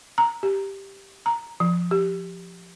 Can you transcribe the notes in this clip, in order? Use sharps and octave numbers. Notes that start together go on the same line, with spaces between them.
A#5
G4
A#5
F3
G4